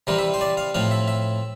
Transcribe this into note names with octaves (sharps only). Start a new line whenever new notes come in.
C3 E3 G3 C4 A#4
E5
C5
D5
F5
A2 F3 C4 F5
E5
E5